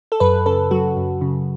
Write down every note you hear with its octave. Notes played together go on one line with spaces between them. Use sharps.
A4
F#2 B4
C#3 A4
F#3 F#4
F#2
C#3